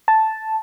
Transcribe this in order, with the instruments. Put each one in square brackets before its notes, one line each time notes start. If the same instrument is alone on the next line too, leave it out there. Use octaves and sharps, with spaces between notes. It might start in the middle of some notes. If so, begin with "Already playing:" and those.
[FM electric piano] A5